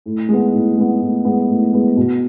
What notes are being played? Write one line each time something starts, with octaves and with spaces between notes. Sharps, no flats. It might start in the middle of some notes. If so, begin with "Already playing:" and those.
A2
G#3 B3
A2
G#3 B3
A2
G#3 B3
A2
G#3 B3
B2